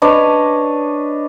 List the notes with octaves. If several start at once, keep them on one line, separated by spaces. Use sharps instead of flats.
D4 B4 C#5 D#5